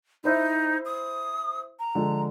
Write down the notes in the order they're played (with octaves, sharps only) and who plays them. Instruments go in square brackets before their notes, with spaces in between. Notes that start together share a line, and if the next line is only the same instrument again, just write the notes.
[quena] D#4 [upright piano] E4 C5 E5
[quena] D#6
A#5
[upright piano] D3 F3 G#3